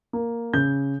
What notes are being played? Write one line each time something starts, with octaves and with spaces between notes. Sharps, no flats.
A#3
C#3 G6